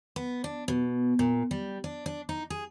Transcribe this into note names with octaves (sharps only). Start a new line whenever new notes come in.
B3
D4
B2
A#2
G3
D4
D4
D#4
G#4